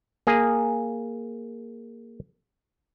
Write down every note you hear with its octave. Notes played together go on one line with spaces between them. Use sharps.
A#3 G#4